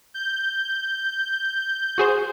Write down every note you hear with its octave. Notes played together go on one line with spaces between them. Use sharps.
G6
F#4 G#4 C5